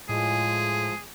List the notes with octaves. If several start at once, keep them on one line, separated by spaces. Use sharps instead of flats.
A2 F3 G#3 G#4